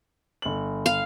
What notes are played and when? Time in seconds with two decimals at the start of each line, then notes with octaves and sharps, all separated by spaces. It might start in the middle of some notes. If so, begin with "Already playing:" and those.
0.42 G1 F#7
0.86 F5